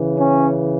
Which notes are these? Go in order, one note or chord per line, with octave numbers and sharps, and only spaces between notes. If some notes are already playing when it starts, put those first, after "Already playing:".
Already playing: C#3 E3
C#4